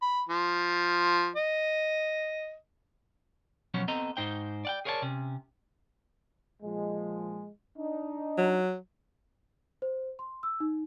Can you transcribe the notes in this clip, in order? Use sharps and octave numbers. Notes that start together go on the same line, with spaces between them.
B5
F3
D#5
B2 F3 F#3 B3 C#4 C#5
B3 C4 A4 D#5 A#5
G#2 D#4 C5 G5
D5 F#5 G5
G#4 A#4 C#5 D5 F5 A5
C3 C#4
A#2 F3 G#3
D4 D#4
F#3
C5
C6
E6
D#4